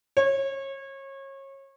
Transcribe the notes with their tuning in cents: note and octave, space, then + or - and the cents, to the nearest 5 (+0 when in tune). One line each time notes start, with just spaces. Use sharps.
C#5 -30